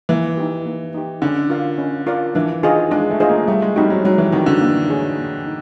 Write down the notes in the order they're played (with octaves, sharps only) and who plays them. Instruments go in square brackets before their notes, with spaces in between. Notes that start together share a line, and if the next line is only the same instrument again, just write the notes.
[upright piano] E3 [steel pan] A#3
[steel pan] D#4 G4
A#3
D#4 G4
[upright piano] D3 [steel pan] C#4
[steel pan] F4 A#4 D5 F5
C#4
F4 A#4 D5 F5
[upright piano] E3 [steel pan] D4
[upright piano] D#3 [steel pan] F4 G#4 C5 D#5
[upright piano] G#3 [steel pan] D4
[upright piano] A3
[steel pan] F4 G#4 C5 D#5
[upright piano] A#3
[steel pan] G3 [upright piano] A3
[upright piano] G#3
[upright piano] G3 [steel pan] C4 D#4 F#4
[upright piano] F#3
[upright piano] F#3 [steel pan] G3
[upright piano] E3
[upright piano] D#3 [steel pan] C4 D#4 F#4
[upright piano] D3
[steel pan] A#3
D#4 G#4 C#5
A#3
D#4